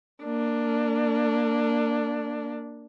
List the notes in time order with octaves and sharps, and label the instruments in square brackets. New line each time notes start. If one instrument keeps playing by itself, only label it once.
[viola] A#3 D4